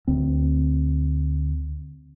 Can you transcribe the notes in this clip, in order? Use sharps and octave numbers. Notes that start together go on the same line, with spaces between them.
D2 C4